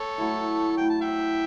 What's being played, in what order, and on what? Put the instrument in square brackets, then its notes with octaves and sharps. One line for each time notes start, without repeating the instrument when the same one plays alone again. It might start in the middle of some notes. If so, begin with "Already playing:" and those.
Already playing: [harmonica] A4 C#5
[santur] F#3 A3 E4
[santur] F#3 A3 E4 [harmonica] G5
[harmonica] A5
E5 G5